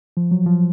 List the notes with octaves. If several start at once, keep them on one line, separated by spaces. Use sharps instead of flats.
F3
F#3
F3